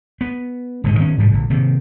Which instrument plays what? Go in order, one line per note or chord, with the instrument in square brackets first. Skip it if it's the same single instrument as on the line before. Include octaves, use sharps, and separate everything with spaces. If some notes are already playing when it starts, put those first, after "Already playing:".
[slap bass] B3
D#1 G#2 D3 D#3
D#3 B3 C#4
G#2 C3 F3 G3
A#1 D3
C3 D#3 A#3